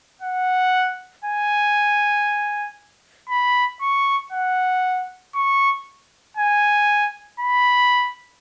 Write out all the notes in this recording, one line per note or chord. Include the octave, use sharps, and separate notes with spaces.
F#5
G#5
B5
C#6
F#5
C#6
G#5
B5